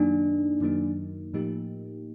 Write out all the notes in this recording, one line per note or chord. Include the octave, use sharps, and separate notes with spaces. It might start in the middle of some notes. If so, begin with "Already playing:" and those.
Already playing: F#2 D#3 F#3 A#3 D4 D#4
F#2 D#3 F#3 A#3 D#4
A2 F3 A#3 D#4 G4